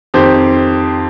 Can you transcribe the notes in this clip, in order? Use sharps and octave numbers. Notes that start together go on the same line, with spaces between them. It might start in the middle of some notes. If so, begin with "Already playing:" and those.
F2 D#3 G4 C5